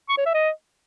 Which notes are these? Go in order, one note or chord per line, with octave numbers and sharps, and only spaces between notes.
C#6
C#5
E5
D#5